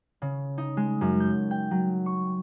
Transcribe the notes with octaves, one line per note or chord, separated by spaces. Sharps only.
C#3
D#4
G#3
F#2
G6
G5
F#3
C#6